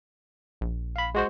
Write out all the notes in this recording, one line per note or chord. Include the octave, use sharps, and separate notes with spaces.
A#1
F5 B5
G#3 F#4 C5